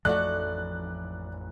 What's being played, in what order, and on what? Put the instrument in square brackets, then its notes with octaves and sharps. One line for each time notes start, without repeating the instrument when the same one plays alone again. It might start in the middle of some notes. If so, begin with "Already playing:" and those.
[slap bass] A1 F2 F3 [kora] A3 D#4 F#4 [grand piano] D5 [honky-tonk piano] F#6